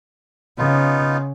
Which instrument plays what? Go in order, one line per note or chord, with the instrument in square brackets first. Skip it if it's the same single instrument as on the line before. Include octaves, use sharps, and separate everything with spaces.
[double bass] C#3 [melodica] B3 D#4 F4